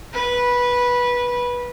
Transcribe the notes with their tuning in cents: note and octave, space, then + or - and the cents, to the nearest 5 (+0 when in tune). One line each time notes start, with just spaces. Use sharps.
B4 -15